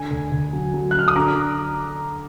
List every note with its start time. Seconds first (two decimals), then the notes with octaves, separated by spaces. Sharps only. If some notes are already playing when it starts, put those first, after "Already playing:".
Already playing: D3 G#5
0.11 D2
0.32 D2
0.53 F#3
0.74 F#3
0.91 F#6
0.95 F#3 F6
1.08 D#6
1.16 D3 A#5 D6